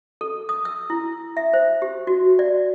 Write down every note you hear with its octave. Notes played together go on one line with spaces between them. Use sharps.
A4
D#6
E6
E4
E5
C5
G4
F#4
D5